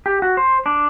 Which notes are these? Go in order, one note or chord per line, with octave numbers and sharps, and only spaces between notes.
G4
F#4
C5
D4